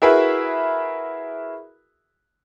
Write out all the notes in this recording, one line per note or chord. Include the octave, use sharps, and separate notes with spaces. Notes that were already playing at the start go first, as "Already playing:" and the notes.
E4 F#4 G#4 A#4 B4 E5